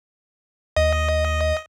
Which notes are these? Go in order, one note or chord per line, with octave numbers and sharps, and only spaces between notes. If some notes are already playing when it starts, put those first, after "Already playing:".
D#2 D#5